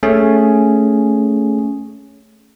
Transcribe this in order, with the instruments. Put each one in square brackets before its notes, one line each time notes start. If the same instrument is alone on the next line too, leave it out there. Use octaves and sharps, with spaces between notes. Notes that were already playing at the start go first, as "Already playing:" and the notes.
[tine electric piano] A3 C#4 G#4